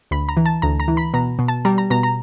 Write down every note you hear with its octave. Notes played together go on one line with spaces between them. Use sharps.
D2 B5
A#5
E3
A5
D2 A#5
A#5
E3
B5
B2 A#5
B2
A5
G3 A#5
A#5
B2 A#5
A#5